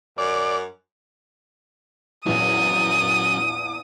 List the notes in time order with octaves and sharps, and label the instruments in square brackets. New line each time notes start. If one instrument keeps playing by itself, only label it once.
[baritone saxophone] F#2 [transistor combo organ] D5
[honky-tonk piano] A#1 E2 [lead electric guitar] F#3 C#4 [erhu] D#6